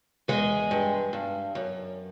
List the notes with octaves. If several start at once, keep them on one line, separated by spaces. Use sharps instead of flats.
E2 G#3 G#4
G2
G2
F#2